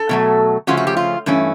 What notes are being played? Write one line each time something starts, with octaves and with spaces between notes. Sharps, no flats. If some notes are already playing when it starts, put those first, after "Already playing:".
Already playing: A4
B2 F#3 A3
C#3 F3 A3 C#4 F4 F#4
F#4
G4
F4
G2 E3 A3 C#4